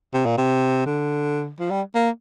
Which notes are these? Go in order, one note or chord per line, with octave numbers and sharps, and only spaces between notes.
C3
A#2
C3
D3
F3
G3
A#3